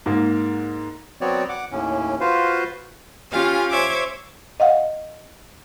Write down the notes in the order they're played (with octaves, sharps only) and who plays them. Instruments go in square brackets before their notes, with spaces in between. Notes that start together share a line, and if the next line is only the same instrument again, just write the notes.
[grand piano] G#2 A#3
[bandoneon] F#3 B3 C4 F#4 C#5 D5
F#5 D6
D#2 A2 C#4
F4 F#4 B4 C5 F5
[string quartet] C#4 F4 G4 F5 G#5
C5 C#5 E5 D6 G#6
[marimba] D#5 F5 F#5